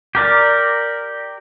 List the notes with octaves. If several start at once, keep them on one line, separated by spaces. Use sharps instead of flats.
G4 A#4 D5